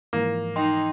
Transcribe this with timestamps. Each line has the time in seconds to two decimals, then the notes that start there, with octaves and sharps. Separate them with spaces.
0.13 G#2 E3 F3 A#3
0.56 D#4 D#5 G5 C6